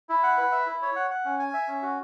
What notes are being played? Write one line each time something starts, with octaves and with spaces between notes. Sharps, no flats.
E4
F#5
B4
E5
E4
C#5
F#5
F#5
C#4
G#5
E5
C#4
F#4